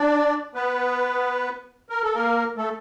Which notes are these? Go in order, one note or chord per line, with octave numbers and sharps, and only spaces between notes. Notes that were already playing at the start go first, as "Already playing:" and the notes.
Already playing: D4 D5
B3 B4
A#4
A4
A#3 A#4
A3 A4